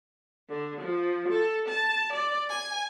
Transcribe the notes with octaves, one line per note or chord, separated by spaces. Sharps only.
D3
F3
A4
A5
D5
G#5